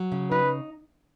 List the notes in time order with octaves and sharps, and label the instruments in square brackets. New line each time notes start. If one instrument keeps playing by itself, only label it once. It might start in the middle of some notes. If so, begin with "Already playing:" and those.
Already playing: [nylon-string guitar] F#3
C#3
[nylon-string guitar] D#4 [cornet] B4